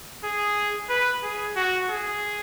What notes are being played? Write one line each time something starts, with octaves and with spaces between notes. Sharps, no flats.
G#4
B4
G#4
F#4
G#4